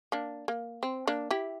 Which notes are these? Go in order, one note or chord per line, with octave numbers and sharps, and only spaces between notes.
A#3 D4
A#3
C4
A#3 D4
E4 G4